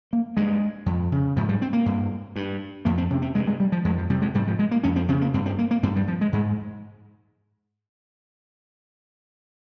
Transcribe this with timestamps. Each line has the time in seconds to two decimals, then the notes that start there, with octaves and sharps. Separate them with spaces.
0.13 A#3
0.37 G2 G#3
0.86 F2
1.12 C#3
1.37 G#2 F3
1.49 G3
1.62 C4
1.73 A#3
1.86 G2
2.36 G2
2.85 F2 A#3
2.98 C4
3.10 C3 C#4
3.22 C4
3.34 G2 G#3
3.47 G#3
3.60 G3
3.72 F3
3.85 F2 G#3
3.98 F3
4.10 C3 G3
4.22 G#3
4.34 G#2 G3
4.47 F3
4.59 G#3
4.71 A#3
4.83 F2 C#4
4.96 C4
5.08 C#3 C4
5.21 A#3
5.34 G2 C4
5.46 C4
5.59 A#3
5.71 A#3
5.83 G2 C4
5.96 G3
6.08 F3
6.21 G#3
6.33 G#2 G#3